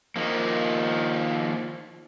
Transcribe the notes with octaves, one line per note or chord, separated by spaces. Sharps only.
D#3 F3 A#3